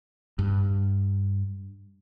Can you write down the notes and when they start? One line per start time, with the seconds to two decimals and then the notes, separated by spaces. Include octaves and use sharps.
0.39 G2